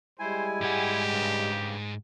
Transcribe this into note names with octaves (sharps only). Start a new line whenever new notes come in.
G3 G#3 E4 C5 G#5
G#2 G4 F#5
G2 C#3